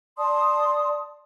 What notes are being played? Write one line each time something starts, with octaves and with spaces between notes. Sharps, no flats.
D5 A5 C6 D#6